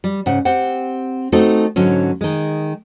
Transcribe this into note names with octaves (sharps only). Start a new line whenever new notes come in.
G3
G#2 C#3 F#5
C4 G4 F#5
A3 C4 D#4 F#4 A4
G#2 D3 F#3 C#4
D#3 G#3